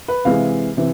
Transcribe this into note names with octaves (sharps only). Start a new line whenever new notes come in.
B4
C3 E3 G#3 F5
C3 E3